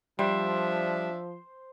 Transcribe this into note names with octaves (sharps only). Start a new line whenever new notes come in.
F3 G3 D4 C5 E5